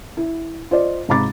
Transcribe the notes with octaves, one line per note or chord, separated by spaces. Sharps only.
E4
F4 C5 D5 D#5
G#2 C3 A#5 B5 D6 A6